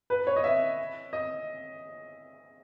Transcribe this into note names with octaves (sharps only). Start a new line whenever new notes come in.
B4
C#5
D#5
E5
D#5